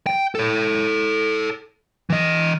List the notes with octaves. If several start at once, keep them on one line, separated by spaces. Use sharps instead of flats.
G5
A4 C#5
E3 D#5